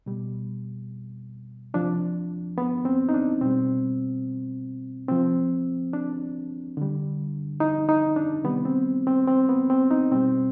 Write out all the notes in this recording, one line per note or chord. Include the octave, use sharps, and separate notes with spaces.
B2 G3
C3 F3 D4
B3
C4
D#4
D4
B2 G3 C4
C3 F3 C4
D4
D3 G3
D#4
D#4
D4
C3 D#3 G3 B3
C4
C4
C4
B3
C4
D#4
B2 G3 C4